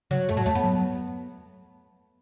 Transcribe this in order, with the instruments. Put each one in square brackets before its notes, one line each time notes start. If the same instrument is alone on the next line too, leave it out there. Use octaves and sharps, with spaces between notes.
[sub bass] C#3 [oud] F#3
[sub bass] F#2 [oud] A3
[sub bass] A2 [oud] F#3
[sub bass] E2 [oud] A3
[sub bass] F#2 [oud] B3
[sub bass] F#3